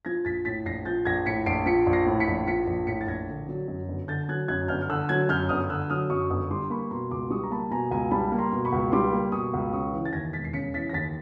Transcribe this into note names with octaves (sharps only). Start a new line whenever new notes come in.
F3 G#6 A#6
A#1 A6 B6
A2 A6 B6
A#1 A#6 C7
F3 G6 A6
A#1 G#6 A#6
A2 B6 C#7
A#1 C7 D7
F3 B6 C#7
A#1
A#6 C7
A2
B6 C#7
A#1
F3 B6 C#7
A#1
A2 B6 C#7
A6
A#1 G#6 A#6
D3
F#3
F#2
G1
D3 G6 A6
F#3 F#6 G#6
F#2 F#6 G#6
G1 F6 G6
F6
D3 E6 F#6
F#3 F#6 G#6
F#2 F6 G6
G1 D#6 F6
D3 E6 F#6
F#3 D#6 F6
F#2 C#6 D#6
G1 C#6 D#6
G3 C6 D6
A#3 B5 C#6
B2 A#5 C6
C#2 C6 D6
G3 C#6 D#6
A#5
A#3 A5 B5
B2 G#5 A#5
C#2 G#5 A#5
G3 A5 B5
A#3
A#5 C6
B2
B5 C#6
C#2
G3 C6 D6
A#3
B2 C#6 D#6
C#2
C#3 C#6 D#6
E3
A6
D#2 G#6 A#6
E1 A6 B6
C7
C#3 B6 C#7
E3 A6 B6
A#6
D#2 A6 B6